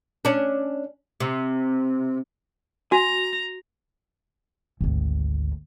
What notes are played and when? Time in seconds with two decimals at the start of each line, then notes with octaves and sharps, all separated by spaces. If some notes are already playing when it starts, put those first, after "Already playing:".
0.25 C#4 D4
1.20 C3
2.92 F#4 G#5 A#5
4.81 G#1 D2